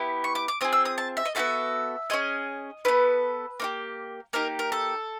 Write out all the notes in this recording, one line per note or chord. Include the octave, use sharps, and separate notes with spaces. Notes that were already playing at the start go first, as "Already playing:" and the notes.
Already playing: B3 E4 G4
C#6
D6
D6
C4 F4 G#4 D#6
E6
D#6
A5
E5
D#5
B3 D#4 F#4 A4 E5
C#4 F4 G#4 D#5
B3 E4 A4 B4
A#3 D#4 G4
A#3 D#4 G4 A#4
A#4
A4